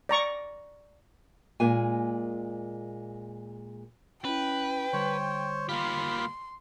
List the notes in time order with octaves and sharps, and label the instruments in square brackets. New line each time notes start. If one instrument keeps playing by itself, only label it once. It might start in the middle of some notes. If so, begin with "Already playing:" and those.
[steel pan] D5 A#5 C#6
[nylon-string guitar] A#2 G#3 A#3 F4 G#5
[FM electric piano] C#4 E4 [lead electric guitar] B4 [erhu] G5
[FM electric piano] D3 G3 [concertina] C5 C#5
[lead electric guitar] A#3 G4 [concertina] F4 B5 [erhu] C6